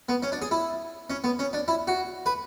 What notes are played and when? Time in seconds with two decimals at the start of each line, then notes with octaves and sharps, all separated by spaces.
0.09 B3
0.23 C#4
0.32 D4
0.42 G#4
0.51 E4
1.10 C#4
1.24 B3
1.39 C#4
1.53 D4
1.68 E4
1.87 F#4
2.26 B4